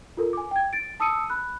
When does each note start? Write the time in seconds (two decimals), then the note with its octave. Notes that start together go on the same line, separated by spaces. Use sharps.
0.17 F4 A4 A#4
0.33 G#5 D6
0.51 G5 G#6
0.73 A6 D7
1.00 A5 D#6 E6 C#7 D#7
1.30 B5 F#6